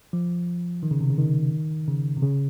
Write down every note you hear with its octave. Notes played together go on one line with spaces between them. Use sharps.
F3
D#3
C#3
C3
C#3
D#3
C#3
C3
C#3